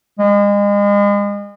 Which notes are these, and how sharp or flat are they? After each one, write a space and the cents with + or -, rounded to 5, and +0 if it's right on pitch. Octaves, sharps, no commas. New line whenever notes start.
G#3 -35